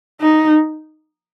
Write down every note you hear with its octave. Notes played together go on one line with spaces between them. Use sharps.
D#4